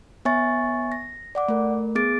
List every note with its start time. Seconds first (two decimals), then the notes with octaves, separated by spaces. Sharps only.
0.25 B3 C#5 E5 G#5 C#6 A6
0.92 A#6
1.35 D5 F#5 D6
1.48 A3 A#4
1.95 B3 G#4 D6 A6 D7